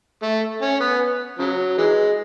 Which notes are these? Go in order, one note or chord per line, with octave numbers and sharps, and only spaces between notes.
A3
C#4
B3
C#3 F#3
E3 G#3